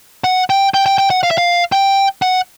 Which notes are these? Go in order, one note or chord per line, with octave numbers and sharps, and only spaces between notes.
F#5
G5
G5
G5
G5
F#5
F5
E5
F5
G5
F#5